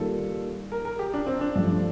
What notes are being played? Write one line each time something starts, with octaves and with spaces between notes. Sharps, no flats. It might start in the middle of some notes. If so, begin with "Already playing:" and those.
Already playing: D#3 G3 A#3 F4 A4
A#4
A#4
G4
D4
C4
D4
G2 F3 A3 D4